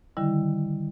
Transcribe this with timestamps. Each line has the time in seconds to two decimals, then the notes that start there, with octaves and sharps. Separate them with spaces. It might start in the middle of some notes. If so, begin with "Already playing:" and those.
0.17 D3 D#3 G3 E4